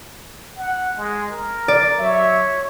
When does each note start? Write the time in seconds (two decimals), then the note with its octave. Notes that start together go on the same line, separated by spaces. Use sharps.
0.57 F#5
0.97 G#3
1.31 A#4
1.68 D5
1.99 F#3 C#5 E5